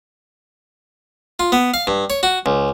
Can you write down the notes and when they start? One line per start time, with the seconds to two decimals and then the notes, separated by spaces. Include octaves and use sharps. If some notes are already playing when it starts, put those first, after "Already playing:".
1.40 F4
1.52 B3
1.74 F5
1.87 G2
2.10 C#5
2.23 F#4
2.46 C#2